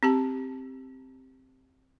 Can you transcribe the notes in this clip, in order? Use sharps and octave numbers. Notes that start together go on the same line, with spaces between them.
C4 G4 A5